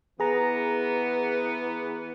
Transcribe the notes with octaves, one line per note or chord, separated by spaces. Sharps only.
E3 B3 G#4 A#5